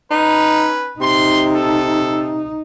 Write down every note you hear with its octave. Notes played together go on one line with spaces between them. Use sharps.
C#4 D#4 B4
C3 D#4 C6
A4